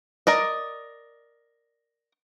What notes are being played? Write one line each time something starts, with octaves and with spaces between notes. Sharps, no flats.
A#4 D5 D#5